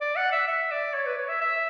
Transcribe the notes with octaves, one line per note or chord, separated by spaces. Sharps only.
D5
F#5
E5
E5
D5
C#5
B4
C#5
E5
E5